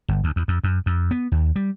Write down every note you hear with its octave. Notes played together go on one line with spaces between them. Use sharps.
G1
D2
E2
F2
F#2
F2
B3
D#2
G3